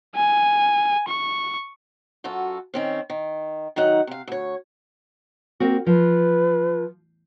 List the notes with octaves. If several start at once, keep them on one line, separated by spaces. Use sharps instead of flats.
G#5
C#6
F#2 F4 F#4 A4
D#3 C4 C#4
D#3
D#3 F#3 D#4 F#5
C3 F5
D2 C#5
A#3 C4 F#4
F3 B4